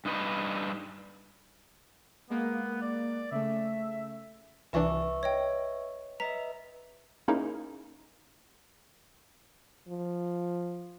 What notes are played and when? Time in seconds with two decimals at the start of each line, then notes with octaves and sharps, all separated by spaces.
0.05 G2 D#4 B4
2.30 G#3 A#3 B3
2.82 D5
3.31 C#3 A3 E5
4.73 C2 E3 D4 B4 E5 C#6
5.23 C#5 D#5 G5
6.20 B4 D#5 E5 A#5 B6
7.28 A#3 C#4 D#4 E4 G#4 A#4
9.88 F3